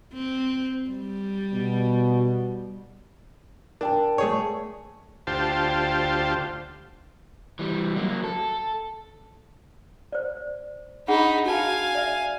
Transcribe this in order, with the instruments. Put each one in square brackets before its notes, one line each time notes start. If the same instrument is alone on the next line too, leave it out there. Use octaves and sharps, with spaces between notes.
[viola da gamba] C4
G3
[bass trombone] B2
[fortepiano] D4 [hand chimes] A#4 G5 A5
[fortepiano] A3 G#4 C#5
[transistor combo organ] D2 F4 G4 C5 A5
[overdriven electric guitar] E3 G3
F#3 A#3
A4
[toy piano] C5 D5
[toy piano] D4 G#4 F#5 [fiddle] D#4 B5
[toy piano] F#4 A5 [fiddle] F5 G#5
[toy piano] D5 E5